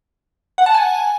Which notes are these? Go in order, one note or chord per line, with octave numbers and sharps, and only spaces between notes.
F#5
A5
G#5